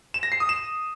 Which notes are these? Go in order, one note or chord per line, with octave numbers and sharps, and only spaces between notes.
E7
A#6
C7
D#6
E7